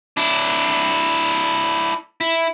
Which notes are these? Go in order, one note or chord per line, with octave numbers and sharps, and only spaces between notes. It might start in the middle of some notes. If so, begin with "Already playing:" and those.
D4 E4
E4